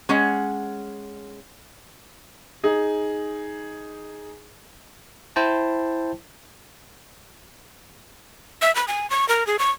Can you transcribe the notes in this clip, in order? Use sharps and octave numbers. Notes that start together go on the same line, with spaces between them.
G#3 C#4 F#5
D#4 G#4
E4 C5 G5 A5
E5
B5
G#5
C#6
A#4
G#4
C#6